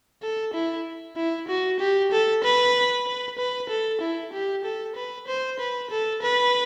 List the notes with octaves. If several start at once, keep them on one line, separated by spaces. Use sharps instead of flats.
A4
E4
E4
F#4
G4
A4
B4
B4
B4
A4
E4
G4
A4
B4
C5
B4
A4
B4